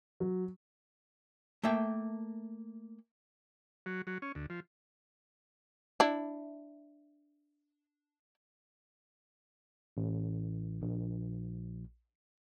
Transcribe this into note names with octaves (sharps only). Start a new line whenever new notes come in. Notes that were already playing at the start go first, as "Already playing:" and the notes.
F#3
A3 A#3 E5 G5
F#3
F#3
C#4
D2
F3
D4 E4
A1
A#1